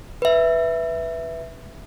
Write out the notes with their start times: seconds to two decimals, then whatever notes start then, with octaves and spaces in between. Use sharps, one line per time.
0.22 B4 E5